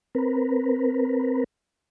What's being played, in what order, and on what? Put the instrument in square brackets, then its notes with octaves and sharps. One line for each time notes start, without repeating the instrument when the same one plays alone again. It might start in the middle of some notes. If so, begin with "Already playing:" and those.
[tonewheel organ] C4 A#4 B4